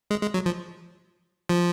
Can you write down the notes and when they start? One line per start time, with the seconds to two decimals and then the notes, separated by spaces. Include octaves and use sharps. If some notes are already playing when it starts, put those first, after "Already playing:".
0.11 G#3
0.22 G#3
0.34 F#3
0.46 F3
1.49 F3